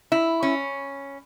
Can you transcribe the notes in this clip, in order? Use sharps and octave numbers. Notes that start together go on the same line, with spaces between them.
E4
C#4